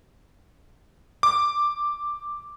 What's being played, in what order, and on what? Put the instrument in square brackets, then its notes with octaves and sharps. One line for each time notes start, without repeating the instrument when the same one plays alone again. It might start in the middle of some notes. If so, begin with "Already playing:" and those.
[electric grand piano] D6